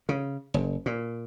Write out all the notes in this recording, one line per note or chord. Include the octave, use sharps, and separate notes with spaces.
C#3
F#1
A#2